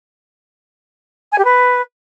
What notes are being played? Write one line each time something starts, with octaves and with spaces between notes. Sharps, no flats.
G#5
G4
B4